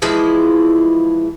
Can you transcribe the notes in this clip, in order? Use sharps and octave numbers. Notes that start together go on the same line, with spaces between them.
E3 F3 G#3 E4